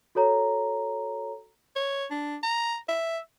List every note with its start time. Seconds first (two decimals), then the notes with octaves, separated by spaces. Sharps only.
0.15 F#4 A4 C#5 A#5
1.76 C#5
2.11 D4
2.43 A#5
2.89 E5